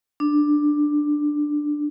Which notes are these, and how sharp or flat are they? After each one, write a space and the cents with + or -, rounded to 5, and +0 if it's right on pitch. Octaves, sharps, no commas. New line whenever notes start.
D4 +10